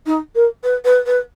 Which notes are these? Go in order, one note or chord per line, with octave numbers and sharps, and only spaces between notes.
D#4
A#4
B4
B4
B4